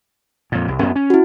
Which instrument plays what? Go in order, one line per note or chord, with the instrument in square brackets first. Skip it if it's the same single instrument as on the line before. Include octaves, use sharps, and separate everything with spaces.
[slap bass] F2 A#2
C2
F#2 B3 C#4
C#4
[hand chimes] E4 F#4